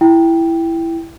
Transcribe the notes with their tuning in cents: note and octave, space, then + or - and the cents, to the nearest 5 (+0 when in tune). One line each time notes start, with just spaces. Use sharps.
E4 +10 G5 +0